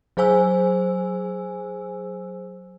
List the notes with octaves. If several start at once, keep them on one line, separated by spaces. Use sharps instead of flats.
F#3 G#4 C5 G#5 E6